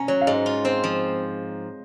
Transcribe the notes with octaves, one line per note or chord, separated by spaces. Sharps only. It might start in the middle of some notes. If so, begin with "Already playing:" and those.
Already playing: C#4 G#5 A#5
F#3 C#5
F5
G#2 D#5
F4
C4 C5
F3